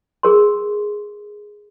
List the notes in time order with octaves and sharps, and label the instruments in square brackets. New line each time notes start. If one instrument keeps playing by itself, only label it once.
[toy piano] G#4 A#4 C6